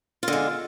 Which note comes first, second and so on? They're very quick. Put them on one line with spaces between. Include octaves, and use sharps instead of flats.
F4 D3 G#3